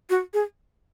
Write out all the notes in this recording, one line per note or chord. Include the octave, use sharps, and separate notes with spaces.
F#4
G#4